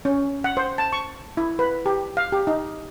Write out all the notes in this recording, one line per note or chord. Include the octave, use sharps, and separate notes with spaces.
C#4
F#5
C5
A5
C#6
E4
B4
G4
F5
G4
D#4